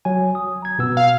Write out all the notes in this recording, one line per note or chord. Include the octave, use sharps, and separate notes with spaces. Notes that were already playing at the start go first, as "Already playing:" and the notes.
F#3 G#5
D#6
A#5 G#6
B2 B3 E6
F5